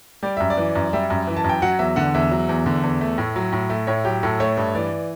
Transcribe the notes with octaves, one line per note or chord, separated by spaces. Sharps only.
G3 D5
F#2 E5
D5
E3
F#2
G3 E5
F#2
E3
A5
F#2
G5
F#3 F#5
E2 E5
D3 F#5
E2 E5
F#3
E2
D3
E2
A3
A2
F#3
A2
A3
A2 C#5
F#3 G4
A2 A4
A3 C#5
G2
E3 D5